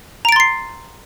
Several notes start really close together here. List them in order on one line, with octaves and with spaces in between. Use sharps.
A#5 D7 A6 C6 C7